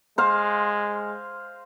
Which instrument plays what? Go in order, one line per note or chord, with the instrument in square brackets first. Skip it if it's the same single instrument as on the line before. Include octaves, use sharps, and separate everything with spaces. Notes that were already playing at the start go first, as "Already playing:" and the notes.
[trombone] G#3 [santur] C5 F5